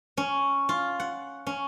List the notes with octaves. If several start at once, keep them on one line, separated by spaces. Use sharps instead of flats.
C#4
F4
F#5
C#4